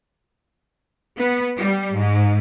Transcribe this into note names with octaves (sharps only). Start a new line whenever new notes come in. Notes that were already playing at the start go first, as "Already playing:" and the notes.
B3
G3
G#2